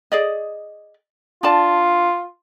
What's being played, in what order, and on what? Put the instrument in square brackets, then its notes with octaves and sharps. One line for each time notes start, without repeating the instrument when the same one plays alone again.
[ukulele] G#4 D5 D#5
[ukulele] D4 D5 A5 [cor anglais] F4